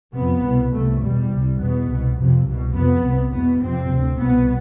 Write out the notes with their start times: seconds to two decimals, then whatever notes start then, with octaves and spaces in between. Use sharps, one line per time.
0.14 F2 C3 B3
0.43 C2 B2
0.72 C2 C3 A3
1.01 E2 B2 G3
1.30 C2 C3
1.59 E2 B2 B3
1.88 C2 B2
2.16 F2 C3
2.46 C2 B2
2.74 F2 C3 B3
3.03 C2 C3
3.32 E2 B2 B3
3.61 F2 C3 C4
3.90 D2 C3
4.19 C2 B2 B3